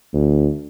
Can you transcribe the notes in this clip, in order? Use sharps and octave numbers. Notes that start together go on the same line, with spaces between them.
D2